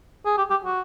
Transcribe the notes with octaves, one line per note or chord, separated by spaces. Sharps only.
G#4
G4
G4
F#4